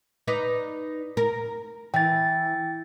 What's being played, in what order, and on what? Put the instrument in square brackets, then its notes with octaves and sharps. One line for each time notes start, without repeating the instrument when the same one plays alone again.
[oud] D#4 B4 D5
A#4
[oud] E3 [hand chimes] G5 A6